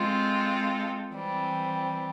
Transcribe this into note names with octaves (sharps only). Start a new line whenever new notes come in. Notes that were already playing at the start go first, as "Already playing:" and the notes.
Already playing: G#3 C4 F4 A4
E3 G3 C4